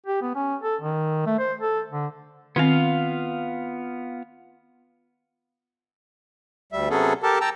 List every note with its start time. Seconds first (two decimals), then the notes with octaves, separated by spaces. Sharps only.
0.06 G4
0.22 B3
0.35 C#4
0.63 A4
0.82 D#3
1.26 A3
1.39 C5
1.61 A4
1.91 D3
2.56 D#3 B3 C4 F4 F5
6.72 D2 G3 E5
6.90 C3 F#3 B3 C#4 G#4 A4
7.23 G4 A4 A#4 A5
7.41 G5 A5 A#5 E6